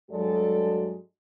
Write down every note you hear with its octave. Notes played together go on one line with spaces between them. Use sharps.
G2 F#3 G#3 F#4 A4 D5